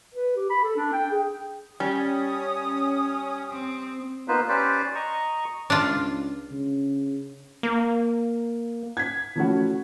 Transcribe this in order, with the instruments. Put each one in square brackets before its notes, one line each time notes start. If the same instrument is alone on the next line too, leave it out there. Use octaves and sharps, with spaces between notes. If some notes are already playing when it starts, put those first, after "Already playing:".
[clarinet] B4
G4
B5
A4
D4
G5
G#4
[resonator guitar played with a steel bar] G3 [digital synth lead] C#4 [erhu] D#6
[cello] C4
[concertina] A#3 B3 D#4 F4 B4 C5
C#4 G4 B4 C5 D5
D#5 A#5 C#6
[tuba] C#2 [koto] D4 F4
[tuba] C#3
[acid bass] A#3
[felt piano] G#6 B6
E3 F3 A3 C#4 E4 F#4